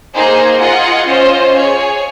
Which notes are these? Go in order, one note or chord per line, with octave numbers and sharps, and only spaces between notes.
A#3 D#4 G#4 C5
F4 G#4 D#5 F#5
C#4 F4 C5 D#5
G#4 C#5 G#5